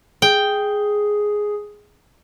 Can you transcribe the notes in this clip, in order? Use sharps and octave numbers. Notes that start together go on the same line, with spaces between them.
G#4 G5